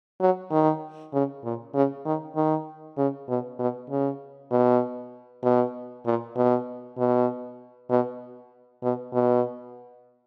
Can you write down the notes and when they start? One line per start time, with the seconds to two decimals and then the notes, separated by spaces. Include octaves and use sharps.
0.21 F#3
0.51 D#3
1.13 C#3
1.44 A#2
1.75 C#3
2.06 D#3
2.36 D#3
2.98 C#3
3.29 B2
3.59 B2
3.90 C#3
4.51 B2
5.44 B2
6.06 A#2
6.36 B2
6.98 B2
7.91 B2
8.83 B2
9.14 B2